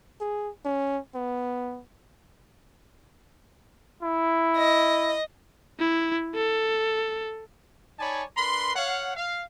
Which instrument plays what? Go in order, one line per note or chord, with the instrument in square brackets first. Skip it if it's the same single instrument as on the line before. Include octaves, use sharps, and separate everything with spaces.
[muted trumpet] G#4
C#4
B3
[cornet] E4
[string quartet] D#5
[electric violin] E4
A4
[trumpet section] D#4 C#5 D5 G#5 A5 B5
D4 A#4 B4 B5 C6
C#5 F5 F#5
F5